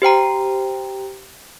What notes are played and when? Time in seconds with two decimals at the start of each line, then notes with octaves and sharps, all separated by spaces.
0.02 G4 C5 G5 A#5